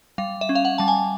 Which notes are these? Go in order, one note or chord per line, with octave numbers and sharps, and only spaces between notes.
G3 F5
E5
C#4
F5
F#5
G3 A5
G#5